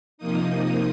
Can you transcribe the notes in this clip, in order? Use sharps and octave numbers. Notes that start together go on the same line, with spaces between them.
C3 F3 A#3 D#4 D#6